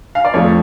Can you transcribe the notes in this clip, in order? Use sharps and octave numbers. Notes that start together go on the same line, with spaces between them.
F5
D5
F2 F3 A3 C#5